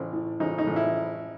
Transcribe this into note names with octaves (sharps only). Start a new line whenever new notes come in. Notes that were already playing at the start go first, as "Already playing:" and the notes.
Already playing: A1 C4
A2
A1 D#4
D#4
A1
E4